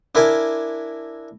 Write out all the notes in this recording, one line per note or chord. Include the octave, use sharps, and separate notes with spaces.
D4 E4 A#4 G#5 D6